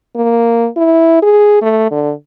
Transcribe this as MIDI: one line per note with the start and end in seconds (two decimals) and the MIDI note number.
0.16 0.68 58
0.77 1.21 64
1.22 1.61 68
1.62 1.89 57
1.91 2.12 50